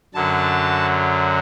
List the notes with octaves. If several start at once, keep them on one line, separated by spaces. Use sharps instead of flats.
F#2 D3 F#3 A5